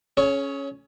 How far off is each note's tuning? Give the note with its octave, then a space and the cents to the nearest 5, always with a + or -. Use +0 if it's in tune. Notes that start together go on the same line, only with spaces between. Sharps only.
C#4 +0 G#4 +40 C#5 +0